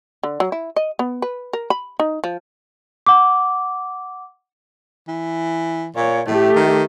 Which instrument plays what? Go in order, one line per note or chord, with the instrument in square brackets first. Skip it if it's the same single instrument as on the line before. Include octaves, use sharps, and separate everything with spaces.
[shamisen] D3
F#3
E4
D#5
B3
B4
A#4
B5
D#4
F3
[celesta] F#5 D6
[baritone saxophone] E3
[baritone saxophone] A#2 [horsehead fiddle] C#5
[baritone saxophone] A2 [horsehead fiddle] A3 G4
[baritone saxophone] D#3